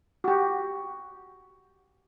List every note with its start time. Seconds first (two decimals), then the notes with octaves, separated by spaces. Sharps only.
0.24 F#4 G4